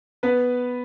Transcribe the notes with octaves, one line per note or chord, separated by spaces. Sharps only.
B3 B4